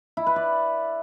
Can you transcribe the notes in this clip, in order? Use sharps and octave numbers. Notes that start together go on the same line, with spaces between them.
E4
B4
D5